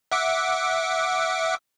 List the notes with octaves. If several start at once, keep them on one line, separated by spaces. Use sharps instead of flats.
E5 F#5 D6